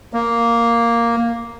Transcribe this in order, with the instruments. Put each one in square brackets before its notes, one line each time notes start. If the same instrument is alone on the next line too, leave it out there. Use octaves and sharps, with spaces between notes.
[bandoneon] A#3